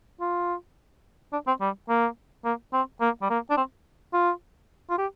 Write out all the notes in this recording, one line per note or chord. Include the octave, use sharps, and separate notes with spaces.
F4
D4
C4
G3
A#3
A#3
C4
A#3
G3
A#3
D4
C4
F4
F4
G4